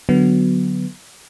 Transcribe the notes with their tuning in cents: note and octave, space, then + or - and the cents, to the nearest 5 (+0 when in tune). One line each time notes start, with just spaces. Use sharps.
D3 +0 F#3 +0 B3 +0